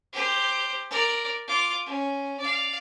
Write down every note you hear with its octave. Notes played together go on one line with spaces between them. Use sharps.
G4 C5
A#4 D5
F4 D6
C#4
D5 F5